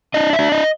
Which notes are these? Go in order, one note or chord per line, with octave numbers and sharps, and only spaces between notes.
D4 D#5
E5
D4
D#5